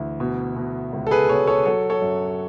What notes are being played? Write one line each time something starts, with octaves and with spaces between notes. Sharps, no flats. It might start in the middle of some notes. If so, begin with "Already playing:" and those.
Already playing: D2 E3
B2
B2
C#2
A4
G#4 B4
B2 A4 C#5
A4 C#5
F#3 A4 C#5
A4 C#5
F#2